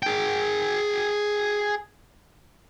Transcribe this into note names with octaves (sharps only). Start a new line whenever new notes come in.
G#4 G5